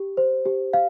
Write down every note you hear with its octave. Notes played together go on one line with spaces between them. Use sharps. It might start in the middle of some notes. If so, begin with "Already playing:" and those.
Already playing: G4
C5
G4
F5